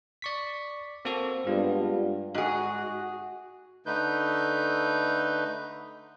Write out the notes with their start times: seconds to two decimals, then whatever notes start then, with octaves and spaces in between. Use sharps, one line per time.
0.22 D5 C#6 B6
1.05 A#3 C4 F#4 A4
1.47 G2 G#3 B3 F4
2.34 G#2 F#4 G#4
3.86 D3 A3 D#4 B4 G6